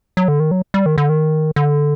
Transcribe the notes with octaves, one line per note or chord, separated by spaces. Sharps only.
F#3
D3
D#3
F#3
G3
D#3
D3
D#3
D3